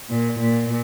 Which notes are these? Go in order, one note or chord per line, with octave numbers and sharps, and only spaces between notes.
A#2
A#2